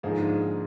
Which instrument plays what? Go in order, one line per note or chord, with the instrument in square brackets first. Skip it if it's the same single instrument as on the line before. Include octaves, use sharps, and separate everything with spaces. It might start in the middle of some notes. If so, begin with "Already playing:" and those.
[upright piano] G#2 [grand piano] D3 F3 A#3 D#4 G#4